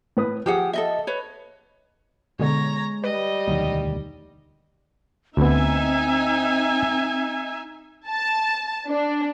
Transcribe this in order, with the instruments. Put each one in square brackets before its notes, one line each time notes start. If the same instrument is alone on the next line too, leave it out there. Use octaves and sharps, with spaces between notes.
[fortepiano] A2 B4 D#6
[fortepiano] F3 [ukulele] G4 G#4 F#5
[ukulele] A4 D#5 E5
B4 C#5
[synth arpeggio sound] B2 D3 [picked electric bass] G#3 [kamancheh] C#5 A#5
[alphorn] G3 [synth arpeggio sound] B4 [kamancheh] D#5
[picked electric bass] E1 D2 D#3 [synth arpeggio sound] F#3
[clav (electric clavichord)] D2 B3 [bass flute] C4 [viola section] D#4 E5 G#5
[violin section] A5
D4